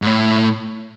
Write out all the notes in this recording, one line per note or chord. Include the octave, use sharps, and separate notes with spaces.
G#2
A2